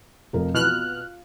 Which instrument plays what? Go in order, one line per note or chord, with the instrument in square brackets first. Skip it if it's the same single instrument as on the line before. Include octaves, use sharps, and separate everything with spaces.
[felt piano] F1 F3 A#4
[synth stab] B2 F6 F#6 [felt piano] E3 F3
[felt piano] F4